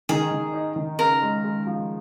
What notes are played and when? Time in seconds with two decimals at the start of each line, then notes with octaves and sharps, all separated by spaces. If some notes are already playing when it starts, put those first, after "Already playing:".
0.09 D#3 G#4
0.31 D#3
0.54 D#4
0.76 D#3
0.99 C#3 A#4
1.22 G#3
1.44 G#3
1.67 F3